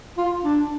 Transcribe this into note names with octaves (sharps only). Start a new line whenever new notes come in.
F4
D4